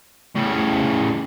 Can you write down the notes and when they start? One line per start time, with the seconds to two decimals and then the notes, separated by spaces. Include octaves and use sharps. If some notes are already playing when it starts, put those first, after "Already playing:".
0.35 A2 C#3